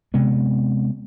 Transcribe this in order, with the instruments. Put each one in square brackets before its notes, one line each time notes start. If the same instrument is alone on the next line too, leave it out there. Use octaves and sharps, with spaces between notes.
[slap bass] C3 G#3 B3